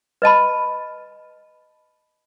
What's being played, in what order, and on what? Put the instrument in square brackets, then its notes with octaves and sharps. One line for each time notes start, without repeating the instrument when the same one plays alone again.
[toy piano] B4 D#5 A5 B5